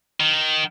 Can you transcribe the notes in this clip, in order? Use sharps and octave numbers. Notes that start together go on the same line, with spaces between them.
D#3